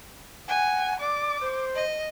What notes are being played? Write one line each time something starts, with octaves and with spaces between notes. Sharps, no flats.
F#5 G#5
D5 D6
C5
D#5